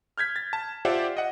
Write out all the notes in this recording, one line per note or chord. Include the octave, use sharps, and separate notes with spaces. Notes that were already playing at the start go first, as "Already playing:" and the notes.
F6 G6 G#6 B6
A6
A5
F4 G4 C5 D5 E5 F#5
D#5 F#5